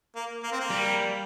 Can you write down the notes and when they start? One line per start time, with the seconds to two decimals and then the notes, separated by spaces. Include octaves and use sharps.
0.16 A#3
0.43 A#3
0.52 C4
0.60 A#3
0.70 G3